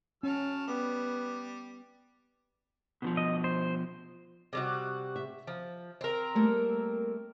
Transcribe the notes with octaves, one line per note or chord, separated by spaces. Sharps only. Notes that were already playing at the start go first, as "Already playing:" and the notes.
F#3 C#4 A5 F6
G3 B3
B2 D#3 F3
D#5
C5
C3 G3 F#4
E5
F3
C4 A#4
G3 A3 A#3